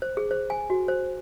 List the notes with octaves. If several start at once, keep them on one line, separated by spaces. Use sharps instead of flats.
C5
G#4
C5
G#5
F#4
C5